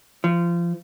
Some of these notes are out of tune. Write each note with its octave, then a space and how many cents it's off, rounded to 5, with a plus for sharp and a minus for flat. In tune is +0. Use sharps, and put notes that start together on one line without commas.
F3 -25